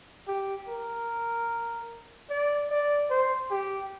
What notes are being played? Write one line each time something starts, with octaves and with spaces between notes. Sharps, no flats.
G4
A#4
D5
D5
C5
G4